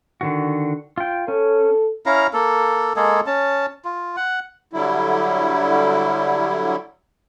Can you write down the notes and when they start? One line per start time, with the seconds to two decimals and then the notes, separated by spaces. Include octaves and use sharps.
0.21 D3 D#3 F#4
0.98 F4 G5
1.28 C#4 A4
2.06 C#4 E4 F5 A#5
2.33 A#3 A4
2.96 G#3 A#3 G#4 A4
3.27 C#4 A5
3.85 F4
4.17 F#5
4.73 D3 F#3 G3 E4